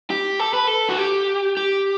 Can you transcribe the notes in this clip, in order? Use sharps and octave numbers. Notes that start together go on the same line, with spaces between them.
G4
A4
B4
A4
F#4
G4
G4